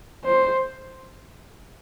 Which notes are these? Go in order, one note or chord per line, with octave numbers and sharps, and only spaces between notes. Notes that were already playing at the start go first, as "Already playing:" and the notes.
C5